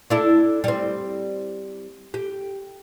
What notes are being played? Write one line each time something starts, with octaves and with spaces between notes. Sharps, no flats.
D4 E4 A4
G3 C4
G4